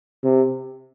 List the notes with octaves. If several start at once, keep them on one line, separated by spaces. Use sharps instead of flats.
C3